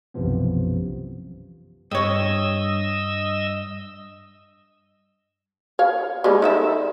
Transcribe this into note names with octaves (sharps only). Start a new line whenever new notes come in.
B1 F#2 C3 E3 F3 B3
G2 C#5 D#5 E6
C#5 F5
G3 G#3 D#4
D#4 A4 E5